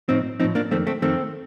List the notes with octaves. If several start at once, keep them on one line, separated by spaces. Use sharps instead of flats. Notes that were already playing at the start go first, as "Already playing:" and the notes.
A2 F3 C4 D#4
A2 F3 C4 D#4
A#3 D4
F2 D#3 A3 C4
A3 C4
F2 D#3 A3 C4